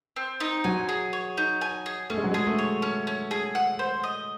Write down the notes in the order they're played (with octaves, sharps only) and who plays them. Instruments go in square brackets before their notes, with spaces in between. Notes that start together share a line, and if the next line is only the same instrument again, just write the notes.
[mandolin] C4
D#4
[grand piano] F#3 [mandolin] G#5
[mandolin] G#4
C#5
D#4
G#5
G#4
[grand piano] A3 [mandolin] C#4
[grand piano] G#3
F#3
[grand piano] G#3 [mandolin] G#4
[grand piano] A3
[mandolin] C#5
C#4
C#4
G#4
F#5
C5
D#5